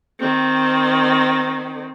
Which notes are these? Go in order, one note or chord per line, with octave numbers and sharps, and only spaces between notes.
D#3 C4